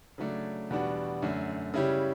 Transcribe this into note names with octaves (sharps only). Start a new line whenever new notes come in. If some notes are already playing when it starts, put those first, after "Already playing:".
C#3 F#3 A3 D4
E2 B2 G3 D4 F#4
F#2 D3 A3
C#3 G3 C#4 E4 G4